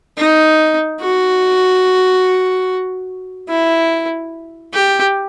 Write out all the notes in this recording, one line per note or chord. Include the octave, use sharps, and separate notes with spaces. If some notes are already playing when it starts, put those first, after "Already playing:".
D#4
F#4
E4
G4